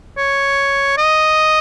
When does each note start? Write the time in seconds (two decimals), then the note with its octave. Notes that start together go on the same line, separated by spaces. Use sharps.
0.17 C#5
0.98 D#5